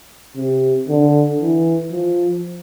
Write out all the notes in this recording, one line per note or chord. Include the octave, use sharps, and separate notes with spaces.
C3
D3
E3
F3